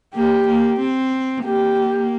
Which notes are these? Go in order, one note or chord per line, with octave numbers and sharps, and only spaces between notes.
A#3 G4
A#3
C4
A#3 G4